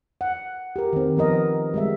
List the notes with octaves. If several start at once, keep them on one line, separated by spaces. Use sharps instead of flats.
F#5
G4 A#4
D#3 C4
F3 B3 A#4 D#5
G3 G#3 E5